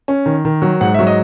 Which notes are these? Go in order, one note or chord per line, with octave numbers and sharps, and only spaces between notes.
C#4
D#3
D#3
F#3
G#2 F#5
E5
F#3
D#5